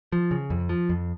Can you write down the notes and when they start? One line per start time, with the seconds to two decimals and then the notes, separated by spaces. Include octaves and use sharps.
0.12 F3
0.31 C#3
0.50 F2
0.69 F3
0.89 F2